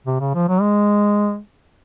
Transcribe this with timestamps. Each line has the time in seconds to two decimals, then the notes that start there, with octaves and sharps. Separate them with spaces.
0.07 C3
0.20 C#3
0.35 F3
0.48 F#3
0.61 G#3